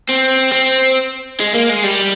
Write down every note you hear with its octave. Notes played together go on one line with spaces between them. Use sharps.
C4
C4
G#3
A#3
G#3
G3